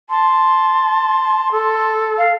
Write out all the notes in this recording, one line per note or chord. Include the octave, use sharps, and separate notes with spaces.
A5 C6
A4
F5